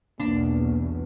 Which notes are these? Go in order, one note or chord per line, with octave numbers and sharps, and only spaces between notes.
B1 E2 B2 A#3 D4